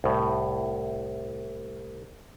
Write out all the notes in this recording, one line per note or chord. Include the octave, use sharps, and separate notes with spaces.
C2 A2